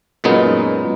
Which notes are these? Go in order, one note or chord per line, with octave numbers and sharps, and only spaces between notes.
F#2 A#2 G#3 B3 D#4